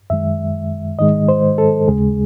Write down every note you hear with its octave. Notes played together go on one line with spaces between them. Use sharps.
F#2 D#3 G#3 E5
G#2 D#3 G#3 D#5
C5
A4
D#2 C#3 G#3 G#4